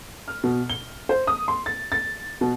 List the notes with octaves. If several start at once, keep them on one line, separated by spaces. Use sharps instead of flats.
F6
B2
G7
C5
D#6
C6
A6
A6
B2